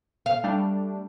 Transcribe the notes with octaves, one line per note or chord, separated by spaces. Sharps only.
F5
G3 A3 D4